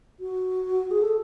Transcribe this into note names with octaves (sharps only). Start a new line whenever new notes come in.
F#4
G#4
A4